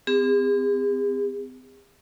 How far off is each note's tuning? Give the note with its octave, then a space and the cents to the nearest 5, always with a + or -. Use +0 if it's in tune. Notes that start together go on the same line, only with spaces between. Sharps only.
C4 -40 G#4 -45